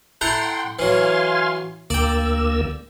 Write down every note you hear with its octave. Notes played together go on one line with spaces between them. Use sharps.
E4 A4 F#5 G5 A#5 C6
E3 F#3 F5 G#5 C6
D2 A#3 D5 G5 E6